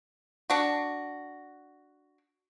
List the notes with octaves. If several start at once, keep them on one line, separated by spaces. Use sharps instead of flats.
D4 F#4